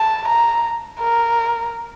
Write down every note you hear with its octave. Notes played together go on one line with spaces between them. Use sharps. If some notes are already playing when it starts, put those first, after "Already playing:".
Already playing: A5
A#5
A#4